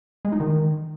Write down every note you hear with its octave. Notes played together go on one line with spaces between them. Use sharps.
G#3
D#4
D#3